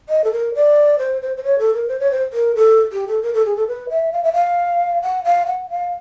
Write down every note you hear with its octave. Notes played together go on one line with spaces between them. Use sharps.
D#5
A4
A#4
D5
C5
C5
C5
C#5
A4
A#4
C5
C#5
C5
A#4
A4
G4
A4
A#4
A4
G#4
A4
B4
E5
F5
E5
F5
F#5
F5
F#5
F5